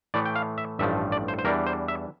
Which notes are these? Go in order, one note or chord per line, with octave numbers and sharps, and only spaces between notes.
A2 E3 A3 D5
G5
F5
E5
A1 G2 F3 A3 E5
D5
C5
C5
E2 E3 G3 D4 A#4
C5
E5